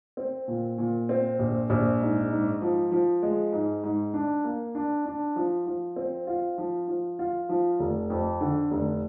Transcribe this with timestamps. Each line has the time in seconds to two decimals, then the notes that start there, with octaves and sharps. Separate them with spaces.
0.17 C4
0.48 A#2
0.78 A#2
1.09 C4
1.39 A#1
1.70 A#1
2.01 G#2
2.30 G#2
2.62 F3
2.92 F3
3.22 G#3
3.53 G#2
3.84 G#2
4.14 D4
4.44 A#3
4.75 D4
5.06 D4
5.36 F3
5.66 F3
5.96 C4
6.27 F4
6.58 F3
6.88 F3
7.19 F4
7.49 F3
7.79 F1
8.10 F2
8.41 D3
8.71 F1